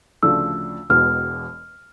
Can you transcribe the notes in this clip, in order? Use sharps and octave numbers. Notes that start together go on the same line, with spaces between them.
D2 C#3 F3 A3 D4 E6
E1 E2 B2 G#3 B3 F6